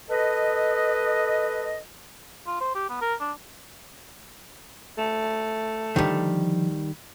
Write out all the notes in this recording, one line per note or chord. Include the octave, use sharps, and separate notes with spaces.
A4 B4 D#5
F4
C5
G4
B3
A#4
D4
A3
D3 D#3 F3 G3